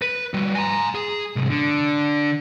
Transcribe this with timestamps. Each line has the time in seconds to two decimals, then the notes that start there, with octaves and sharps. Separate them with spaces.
0.02 B4
0.34 G3 F#4
0.55 G#5 A#5
0.95 G#4
1.36 C2 G#2
1.49 D3